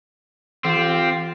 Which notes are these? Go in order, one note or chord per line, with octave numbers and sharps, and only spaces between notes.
E3 C4 F4 G4 F5